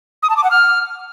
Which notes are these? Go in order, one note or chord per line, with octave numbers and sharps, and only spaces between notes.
D#6
A5
D6
F#5
F6